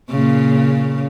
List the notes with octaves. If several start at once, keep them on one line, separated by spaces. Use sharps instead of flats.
A#2 C#3